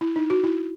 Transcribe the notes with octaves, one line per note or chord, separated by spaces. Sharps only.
E4
D#4
F#4
E4